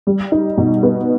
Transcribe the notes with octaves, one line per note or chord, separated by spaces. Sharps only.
G3
D#4
B2
B3